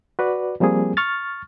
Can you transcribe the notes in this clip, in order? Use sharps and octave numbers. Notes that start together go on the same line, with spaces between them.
F#4 B4 D5
F3 G3 A#3 C4 G#4
C#6 F6 A6